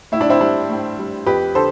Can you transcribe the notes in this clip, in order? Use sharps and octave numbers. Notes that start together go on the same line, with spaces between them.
A2 E4
D4
C4 E4
G3 D4
A2
G3
F2 G4 B4
D3 A4 C5